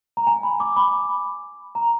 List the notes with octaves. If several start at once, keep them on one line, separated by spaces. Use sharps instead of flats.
A#5
G#5
B5
D6
B5
A#5